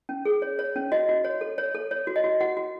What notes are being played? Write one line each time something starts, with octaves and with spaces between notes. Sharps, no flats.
C#4
G#4
C#5
C#5
C#4
F#4 D#5
F#4
C#5
A4
C#5
A4
C#5
F#4
D#5
F#4
F#4 F#5
F#4